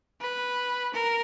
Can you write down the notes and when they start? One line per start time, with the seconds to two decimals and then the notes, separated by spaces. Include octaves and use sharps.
0.21 B4
0.93 A#4